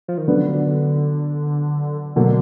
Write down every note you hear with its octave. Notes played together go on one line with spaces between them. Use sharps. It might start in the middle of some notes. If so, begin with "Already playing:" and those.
F3
D#3
D3 F#3 B3 D4
B2 D3 F#3 A#3